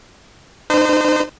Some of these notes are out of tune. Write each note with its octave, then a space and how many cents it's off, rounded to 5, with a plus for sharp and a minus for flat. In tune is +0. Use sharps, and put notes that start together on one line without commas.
D#4 -40 C5 -30